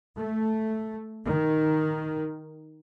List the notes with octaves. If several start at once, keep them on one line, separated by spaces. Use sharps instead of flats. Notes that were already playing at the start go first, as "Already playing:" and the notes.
A3
D#3